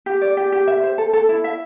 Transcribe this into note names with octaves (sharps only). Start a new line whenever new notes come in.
G4
D5
G4
G4
E5
C5
A4
A4
E4
E5